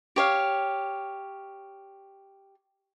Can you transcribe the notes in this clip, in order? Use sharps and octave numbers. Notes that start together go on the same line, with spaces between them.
G4 C#5 F5